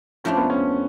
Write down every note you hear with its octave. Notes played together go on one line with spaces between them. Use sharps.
F2 F3 A3 C#4 D4 F4
B3
C#4